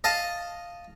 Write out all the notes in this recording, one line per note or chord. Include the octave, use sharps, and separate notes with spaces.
D#5 F5 A5